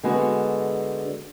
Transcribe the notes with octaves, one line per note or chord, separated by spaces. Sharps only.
D3 G#3 B3 F#4